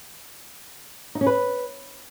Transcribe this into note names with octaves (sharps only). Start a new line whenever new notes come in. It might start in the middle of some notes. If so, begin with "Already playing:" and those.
D#4
C#4
B4